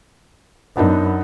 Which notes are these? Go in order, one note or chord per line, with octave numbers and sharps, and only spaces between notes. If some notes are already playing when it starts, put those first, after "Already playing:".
F#2 B3 D4 D#4